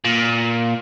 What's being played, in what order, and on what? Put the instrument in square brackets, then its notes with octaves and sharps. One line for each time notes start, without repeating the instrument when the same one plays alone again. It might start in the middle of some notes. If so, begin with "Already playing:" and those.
[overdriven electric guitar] A#2